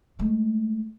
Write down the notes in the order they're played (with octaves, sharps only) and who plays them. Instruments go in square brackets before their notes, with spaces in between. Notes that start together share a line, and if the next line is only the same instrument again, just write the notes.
[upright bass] G#3 A3